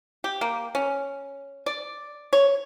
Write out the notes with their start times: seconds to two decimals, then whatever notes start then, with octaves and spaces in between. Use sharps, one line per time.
0.24 G4
0.41 A#3
0.75 C#4
1.66 D5
2.33 C#5